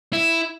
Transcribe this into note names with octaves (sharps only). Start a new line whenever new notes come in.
E4